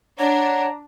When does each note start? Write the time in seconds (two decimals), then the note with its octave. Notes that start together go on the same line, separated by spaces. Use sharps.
0.19 D4 C#5 F#5 A#5